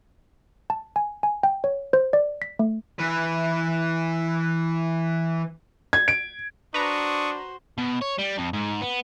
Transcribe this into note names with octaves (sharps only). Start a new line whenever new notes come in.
A5
G#5
G#5
G5
C#5
C5
D5
B6
A3
E3 B4
G#6
D7
D4 F#4 B4 C5 A#5 C#6 D#6
B2
C#5
G3
F2
G#2
B3